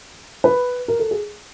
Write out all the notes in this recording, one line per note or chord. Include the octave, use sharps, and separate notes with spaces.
B4
A#4
A4
G#4